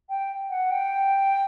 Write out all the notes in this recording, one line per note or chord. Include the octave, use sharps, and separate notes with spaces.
G5
F#5
G5